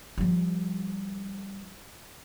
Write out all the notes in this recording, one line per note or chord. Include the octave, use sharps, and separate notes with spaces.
F3 G3